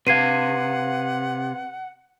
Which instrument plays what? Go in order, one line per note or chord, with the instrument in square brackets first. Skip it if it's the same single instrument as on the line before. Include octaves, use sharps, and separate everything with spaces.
[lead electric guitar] C3 [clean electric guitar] B4 F5 [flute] F#5 [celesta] G#6 C7 D#7